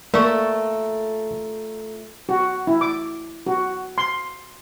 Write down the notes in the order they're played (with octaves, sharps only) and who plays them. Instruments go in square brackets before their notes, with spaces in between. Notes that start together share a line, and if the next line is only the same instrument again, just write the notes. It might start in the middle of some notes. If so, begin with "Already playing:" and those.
[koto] A3 [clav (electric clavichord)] A#3 [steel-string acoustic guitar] F4 A4 A#4 [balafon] D5 C#6
[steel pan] F#4
E4
D6
F#4
C6